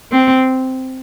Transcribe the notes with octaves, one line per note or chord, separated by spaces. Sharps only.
C4